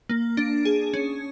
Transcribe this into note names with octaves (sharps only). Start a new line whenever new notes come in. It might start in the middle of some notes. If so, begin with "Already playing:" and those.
A#3
D4
G#4
C#4